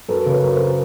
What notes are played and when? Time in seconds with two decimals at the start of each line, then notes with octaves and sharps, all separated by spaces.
0.09 F#2 A4 B4
0.26 C#3
0.31 B4 C#5
0.43 F#2
0.55 A#4 C5